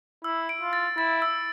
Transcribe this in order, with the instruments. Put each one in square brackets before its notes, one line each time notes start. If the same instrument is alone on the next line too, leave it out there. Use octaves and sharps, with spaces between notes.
[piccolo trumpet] E4 [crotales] E6
[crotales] D7
[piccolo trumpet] F4
[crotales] A6
[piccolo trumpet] E4 [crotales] A6
[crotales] E6